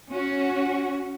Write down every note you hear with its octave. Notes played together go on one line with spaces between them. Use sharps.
C#4 F#4